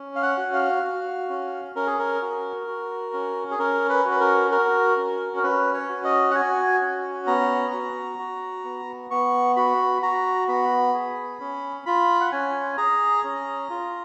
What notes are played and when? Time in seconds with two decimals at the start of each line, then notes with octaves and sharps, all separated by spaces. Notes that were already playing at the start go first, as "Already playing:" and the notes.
Already playing: C#4
0.16 F5
0.22 F#5
0.38 F#4
0.53 F5
0.84 F#4
1.30 C#4
1.75 C#4 A#4
1.87 G#4
1.99 A#4
2.22 F#4
2.67 F#4
3.13 C#4
3.51 G#4
3.59 C#4 A#4
3.89 B4
4.05 F#4
4.11 B4
4.21 A#4
4.51 F#4 A#4
4.97 C#4
5.37 A#4
5.43 C#4 B4
5.74 C#5
5.89 F#4
6.05 D#5
6.31 F#5
6.35 F#4 G#5
6.81 C#4
7.27 B3 A#5
7.73 F#4
8.19 F#4
8.64 B3
9.10 B3 C#6
9.56 F#4 B5
10.02 F#4 A#5
10.48 B3 B5
10.94 G#4
11.40 C#4
11.86 F4 B5
12.21 F#5
12.32 C#4 G#5
12.78 G#4 A#5
13.24 C#4
13.70 F4